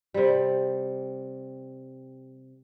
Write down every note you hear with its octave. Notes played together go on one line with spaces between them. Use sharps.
C3 G3